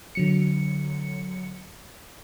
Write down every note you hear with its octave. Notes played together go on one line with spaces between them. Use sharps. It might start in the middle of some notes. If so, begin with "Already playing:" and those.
D3 F#3 C#7